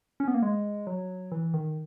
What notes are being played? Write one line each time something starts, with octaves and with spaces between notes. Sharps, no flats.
C#4
B3
A#3
G#3
F#3
E3
D#3